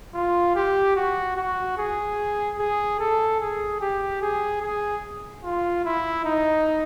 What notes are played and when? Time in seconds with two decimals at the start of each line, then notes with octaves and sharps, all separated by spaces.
0.14 F4
0.55 G4
0.96 F#4
1.37 F#4
1.77 G#4
2.59 G#4
3.00 A4
3.40 G#4
3.81 G4
4.21 G#4
4.62 G#4
5.44 F4
5.84 E4
6.25 D#4